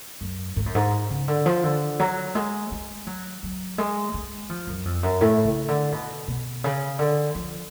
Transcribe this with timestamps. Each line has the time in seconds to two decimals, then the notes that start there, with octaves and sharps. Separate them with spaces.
0.21 F#2
0.56 G#2
0.66 F#2
0.75 G#2
1.10 C#3
1.28 D3
1.46 F3
1.64 D3
2.00 F#3
2.35 G#3
2.71 G#3
3.07 F#3
3.43 F#3
3.78 G#3
4.14 G#3
4.50 F3
4.67 F#2
4.85 F2
5.03 F#2
5.21 A2
5.45 C#3
5.68 D3
5.92 B2
6.28 B2
6.64 C#3
6.99 D3
7.35 F3